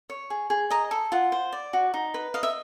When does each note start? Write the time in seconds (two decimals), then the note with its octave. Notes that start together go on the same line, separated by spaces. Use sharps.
0.10 C#5
0.30 G#4
0.50 G#4
0.70 D#5 A#5
0.91 A4
1.12 F4 F#5
1.32 C5
1.53 D5
1.73 F#4
1.94 D#4
2.14 B4
2.34 D#5 F5
2.43 E5